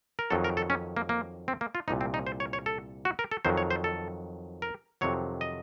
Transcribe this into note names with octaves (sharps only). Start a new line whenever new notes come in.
A#4
F2 D#3 F#3 A4
A#4
A4
C#4
A#3
A#3
C4
A#3
F4
C2 A#2 F3 D#4
C4
D#4
C5
C#5
C#5
A4
F#4
A#4
A4
F2 D#3 F#3 C5
C#5
C5
A4
A#4
F2 C3 D#3 F#3 C#5
D#5